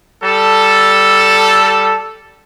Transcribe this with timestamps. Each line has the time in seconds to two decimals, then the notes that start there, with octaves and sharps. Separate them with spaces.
0.23 G3 A4